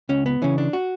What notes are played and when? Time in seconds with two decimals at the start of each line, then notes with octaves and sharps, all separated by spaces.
0.09 C#2 C#4
0.26 B3
0.42 C#3 E3 C#4
0.58 D4
0.73 F#4